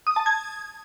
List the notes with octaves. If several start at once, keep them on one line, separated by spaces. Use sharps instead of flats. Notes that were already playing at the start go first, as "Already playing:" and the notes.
D#6
A5
G#6